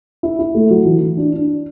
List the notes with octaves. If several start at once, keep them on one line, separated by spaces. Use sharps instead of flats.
E4
E4
A3
F#3
E3
E3
D4
D4